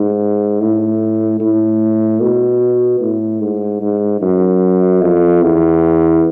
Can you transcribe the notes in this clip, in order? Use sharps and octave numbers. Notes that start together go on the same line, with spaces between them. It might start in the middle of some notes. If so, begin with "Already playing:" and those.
Already playing: G#2
A2
A2
B2
A2
G#2
G#2
F#2
F2
E2